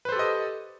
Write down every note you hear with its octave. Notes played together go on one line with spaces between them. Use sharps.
G4 A4 B4 C5 D#5